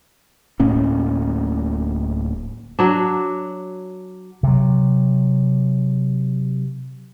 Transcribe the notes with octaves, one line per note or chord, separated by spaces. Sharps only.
D1 A2 A#3 C#4
F#3 D4
C3 F#3